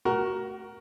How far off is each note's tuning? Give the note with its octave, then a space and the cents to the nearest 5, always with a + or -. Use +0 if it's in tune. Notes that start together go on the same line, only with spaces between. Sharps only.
F#4 +25 A#4 +10 C#6 +0